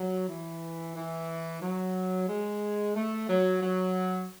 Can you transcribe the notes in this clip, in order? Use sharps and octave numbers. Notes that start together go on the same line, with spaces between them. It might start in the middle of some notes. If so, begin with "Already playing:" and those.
Already playing: F#3
E3
E3
F#3
G#3
A3
F#3
F#3